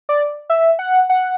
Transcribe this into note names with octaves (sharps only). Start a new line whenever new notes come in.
D5
E5
F#5
F#5